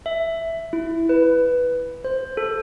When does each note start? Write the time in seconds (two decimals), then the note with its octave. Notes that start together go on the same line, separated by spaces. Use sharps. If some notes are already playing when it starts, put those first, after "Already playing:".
0.06 E5
0.73 E4
1.09 B4
2.04 C5
2.37 A4